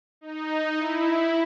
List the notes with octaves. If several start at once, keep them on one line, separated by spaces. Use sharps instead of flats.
D#4
E4